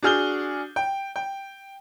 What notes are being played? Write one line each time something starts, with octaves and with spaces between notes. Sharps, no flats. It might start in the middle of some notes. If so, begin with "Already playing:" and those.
D4 F#4 G#4 F6 G6 G7
G5
G5